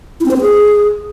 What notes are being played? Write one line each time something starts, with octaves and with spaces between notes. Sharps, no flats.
E4
C4
C5
C4
G#4